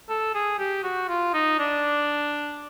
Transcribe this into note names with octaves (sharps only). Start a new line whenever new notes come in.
A4
G#4
G4
F#4
F4
D#4
D4